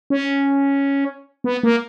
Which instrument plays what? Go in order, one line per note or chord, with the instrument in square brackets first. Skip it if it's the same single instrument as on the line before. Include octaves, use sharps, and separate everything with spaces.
[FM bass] C#4
B3
A#3